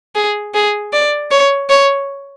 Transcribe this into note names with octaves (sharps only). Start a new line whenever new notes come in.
G#4
G#4
D5
C#5
C#5